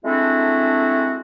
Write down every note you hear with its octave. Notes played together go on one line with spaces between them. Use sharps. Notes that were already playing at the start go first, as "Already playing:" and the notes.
G#3 A3 C4 D4 E4 F#4